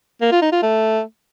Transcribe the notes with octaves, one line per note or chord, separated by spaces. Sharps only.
A#3
F4
D#4
F4
A3